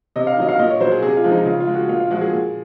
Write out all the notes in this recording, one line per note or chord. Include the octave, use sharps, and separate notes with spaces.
C3 D#5
F5
D#3 F#3 D#5
F5
A#2 D#5
C#5
F#3 C5
G#4
C3 G#4
F4
F3 G#3
D#4
C#3 F4
F4
G#3
F#4
A#2 F4
F4
F3 G#3 F#4
G#4
A#2